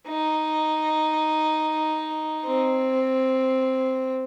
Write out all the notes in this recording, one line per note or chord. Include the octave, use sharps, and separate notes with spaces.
D#4
C4